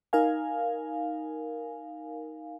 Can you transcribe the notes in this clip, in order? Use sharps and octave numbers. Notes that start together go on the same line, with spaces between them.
D#4 A#4 F5 G#5